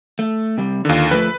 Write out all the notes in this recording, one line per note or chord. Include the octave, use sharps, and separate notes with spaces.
A3
C3 G3
D#2 D3 D#3 F4
F3 A3 B4